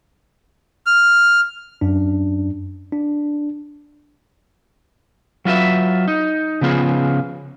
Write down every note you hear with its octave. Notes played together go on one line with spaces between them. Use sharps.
F6
F#2 D4
D4
F#3 F4 B4 E5
D#4
C#3 F3 B3 F4 G#4